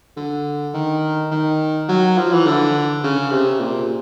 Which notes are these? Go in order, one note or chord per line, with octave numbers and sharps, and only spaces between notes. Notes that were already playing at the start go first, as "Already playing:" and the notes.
D3
D#3
D#3
F#3
F3
E3
D3
C#3
C3
A#2